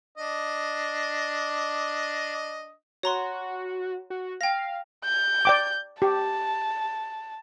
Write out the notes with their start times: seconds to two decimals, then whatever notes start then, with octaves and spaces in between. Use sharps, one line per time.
0.18 D4 D#5
3.03 F#4 C#5 A#5 C6
4.10 F#4
4.41 F5 G5 A#6
5.04 G6
5.45 D5 G5 D6
6.02 G4 A5